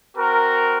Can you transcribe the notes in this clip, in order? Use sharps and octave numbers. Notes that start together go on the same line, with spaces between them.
C4 F#4 A#4